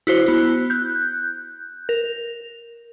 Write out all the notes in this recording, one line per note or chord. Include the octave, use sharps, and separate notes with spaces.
E4 F#4 C5
B3 E4
F#6 G6
A#4